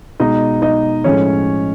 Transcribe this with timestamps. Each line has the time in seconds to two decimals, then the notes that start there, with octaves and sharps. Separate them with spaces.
0.20 B2 G#3 D#4 D#5
0.62 D#4 D#5
1.04 A2 F3 G#3 C#4 C#5